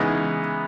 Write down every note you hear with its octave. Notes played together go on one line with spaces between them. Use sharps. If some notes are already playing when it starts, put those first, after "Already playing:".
Already playing: C#3 E3 G#3 B3 D#4